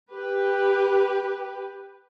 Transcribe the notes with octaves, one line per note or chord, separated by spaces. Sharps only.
G4 B4